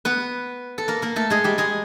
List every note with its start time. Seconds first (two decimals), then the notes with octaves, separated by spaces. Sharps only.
0.05 B3 B4
0.78 A4
0.88 A#3 A#4
1.02 A#3 A#4
1.16 A3 A4
1.30 G#3 G#4
1.44 G3 G4
1.58 G#3 G#4